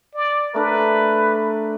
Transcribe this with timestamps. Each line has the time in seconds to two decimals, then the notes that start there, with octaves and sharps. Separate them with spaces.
0.14 D5
0.54 A3 D4 A#4 B4